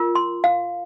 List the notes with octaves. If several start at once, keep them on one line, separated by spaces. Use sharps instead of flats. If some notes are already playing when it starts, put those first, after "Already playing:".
Already playing: F4 A#4
C6
F5